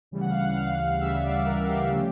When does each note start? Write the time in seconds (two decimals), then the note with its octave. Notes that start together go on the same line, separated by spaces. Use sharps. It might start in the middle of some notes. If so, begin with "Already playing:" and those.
0.11 D2 C#3 E3 G3
0.21 F#5
0.29 F5
0.40 F#5
0.56 F5
1.00 D2 C#3 E3 G3 E5
1.23 D5
1.45 A#4
1.68 G4
1.90 D3 F3 A3 C#4 G4